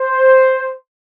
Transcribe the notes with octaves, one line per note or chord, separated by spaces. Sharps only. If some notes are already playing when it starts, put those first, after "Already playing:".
Already playing: C5